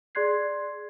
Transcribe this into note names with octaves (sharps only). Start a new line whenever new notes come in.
G#4 D5 C6 F#6 G#6 C7